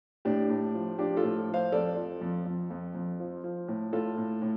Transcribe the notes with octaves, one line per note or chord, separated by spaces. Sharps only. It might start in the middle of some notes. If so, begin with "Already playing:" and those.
A2 D4 G4
A2
F3
F3 D4 G4
F4 A4
A2
F3
C5 F5
F2 A4 D5
F3
F2
F2
F2
F2
F3
F3
A2
A2 F4 A4
A2
A2